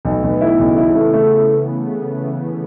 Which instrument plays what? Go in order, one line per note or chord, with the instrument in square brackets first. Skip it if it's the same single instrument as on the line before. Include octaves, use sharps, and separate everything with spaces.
[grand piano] B1 [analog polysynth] A3
[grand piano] B1 [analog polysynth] B3
[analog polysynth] E3 [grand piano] E4
[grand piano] B1 [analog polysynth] C#3
[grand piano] E4
A3
A3